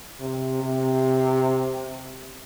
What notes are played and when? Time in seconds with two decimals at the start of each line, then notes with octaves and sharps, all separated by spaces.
0.20 C3
0.63 C3